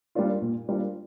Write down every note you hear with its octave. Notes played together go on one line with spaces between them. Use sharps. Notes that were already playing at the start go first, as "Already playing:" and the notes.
G3 A#3 D4 F4
A#2
G3 A#3 D4 F4